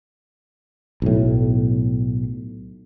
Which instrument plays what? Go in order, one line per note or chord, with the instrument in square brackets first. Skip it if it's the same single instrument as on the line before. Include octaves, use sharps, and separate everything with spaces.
[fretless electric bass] B1 A2